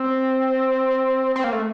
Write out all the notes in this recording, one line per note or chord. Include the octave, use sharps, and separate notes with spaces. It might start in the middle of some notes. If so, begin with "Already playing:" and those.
Already playing: C4
C4
A#3
A3